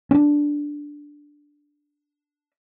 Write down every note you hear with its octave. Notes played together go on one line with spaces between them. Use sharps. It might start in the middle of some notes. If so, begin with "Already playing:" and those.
C#4 D4